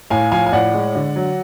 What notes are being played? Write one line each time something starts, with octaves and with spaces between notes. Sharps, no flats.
A2 F5 G#5
F3 F5 G#5
G#5
A2 D5 F#5
G#3
D3
F#3